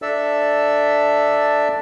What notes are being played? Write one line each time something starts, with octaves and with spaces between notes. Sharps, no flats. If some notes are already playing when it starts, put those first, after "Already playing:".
D4 A4 D5 E5 E6